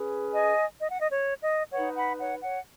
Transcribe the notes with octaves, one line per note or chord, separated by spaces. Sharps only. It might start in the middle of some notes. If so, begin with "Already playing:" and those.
Already playing: C#4 G#4 B4
D#5 G#5
D#5
F#5
D#5
C#5
D#5
D#4 B4 C#5 F#5
F#5 B5
C#5 F#5
C#5 F#5